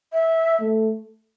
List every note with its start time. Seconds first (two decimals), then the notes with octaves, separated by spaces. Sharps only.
0.13 E5
0.60 A3